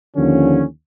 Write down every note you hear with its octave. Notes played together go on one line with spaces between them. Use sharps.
D#2 D3 F3 C#4